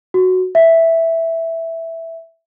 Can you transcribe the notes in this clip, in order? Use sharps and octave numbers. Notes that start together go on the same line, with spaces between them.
F#4
E5